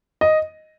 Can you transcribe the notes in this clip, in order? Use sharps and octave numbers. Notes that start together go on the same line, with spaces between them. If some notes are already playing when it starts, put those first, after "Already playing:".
D#5